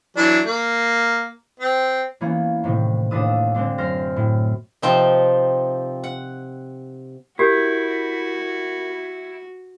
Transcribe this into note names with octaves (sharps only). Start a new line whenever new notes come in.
E3 F#3 D4
A#3
C4
E3 A#3 B3 C#4
A2 C3 D#3
D#2 A2 D4 A4 B4 D#6
D3 G#3 C4 D4
F#2 C5 F6 A#6
A2
C3 F3 C4 D#4
F#5
E4 F#4 G4 A#4 G6